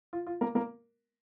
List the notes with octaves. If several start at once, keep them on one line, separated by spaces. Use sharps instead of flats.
F4
F4
A#3 A#4
A#3 A#4